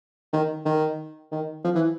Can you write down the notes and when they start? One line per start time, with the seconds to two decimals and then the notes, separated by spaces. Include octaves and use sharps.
0.33 D#3
0.65 D#3
1.32 D#3
1.64 F3
1.75 E3